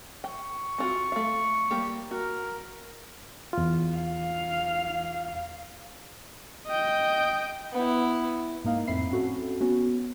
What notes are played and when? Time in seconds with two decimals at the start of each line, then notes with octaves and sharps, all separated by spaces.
0.24 G5 C#6
0.78 C4 F4 F#4
1.12 A3 F5
1.71 G3 A#3 G4
2.11 F#4 A#4
3.53 E2 F4
3.96 F5
6.67 D#5 G5
7.73 B3 E4
8.64 G#2 A#3 D#4 F5
8.87 F2 A2 C4 E5 B5 C7
9.10 C4 C#4 F#4 A4
9.61 B3 C#4 F#4